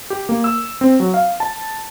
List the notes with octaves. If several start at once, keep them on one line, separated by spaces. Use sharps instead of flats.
G4
A#3
E6
C4
F#3
F5
A5